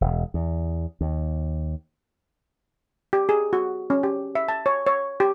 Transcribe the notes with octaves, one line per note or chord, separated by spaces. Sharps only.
E1
E2
D#2
G4
G#4
F#4
C#4
G4
E5
A5
C#5
C#5
G4